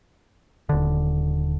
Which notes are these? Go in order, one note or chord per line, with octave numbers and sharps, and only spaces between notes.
D#1 D3